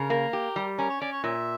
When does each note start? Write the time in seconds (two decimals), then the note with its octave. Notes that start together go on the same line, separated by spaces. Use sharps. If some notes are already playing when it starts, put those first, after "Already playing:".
Already playing: C#3 A#4
0.10 A#3
0.33 G4
0.56 G3
0.78 C#4 A#4
0.90 C#5
1.01 C#4 D5
1.12 C#5
1.24 A#2 E5